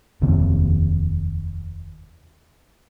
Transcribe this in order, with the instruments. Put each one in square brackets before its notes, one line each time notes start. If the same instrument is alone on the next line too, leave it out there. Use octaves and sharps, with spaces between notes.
[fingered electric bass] F1 D#2 C3